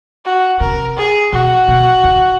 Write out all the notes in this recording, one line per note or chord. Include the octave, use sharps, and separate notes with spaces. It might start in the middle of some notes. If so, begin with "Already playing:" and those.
F#4
C3 A#4
G#4
B2 F#4
B2
C#3